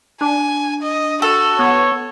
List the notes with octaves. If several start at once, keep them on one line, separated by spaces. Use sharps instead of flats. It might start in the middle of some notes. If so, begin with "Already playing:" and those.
D4 G#5
D#5
F#4 A4
B3 C#5